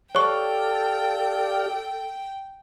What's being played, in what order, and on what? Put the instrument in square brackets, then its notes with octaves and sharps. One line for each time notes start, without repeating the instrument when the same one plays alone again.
[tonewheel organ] G4 D5 F5 [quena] A4 [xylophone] C#5 C#6 [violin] G5